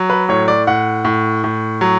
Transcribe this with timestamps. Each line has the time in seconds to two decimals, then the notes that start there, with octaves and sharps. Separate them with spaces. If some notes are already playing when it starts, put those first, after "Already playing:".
Already playing: F#3
0.10 B4
0.29 A2 C#5
0.48 D5
0.67 A2 F#5
1.05 A2
1.44 A2
1.81 F#3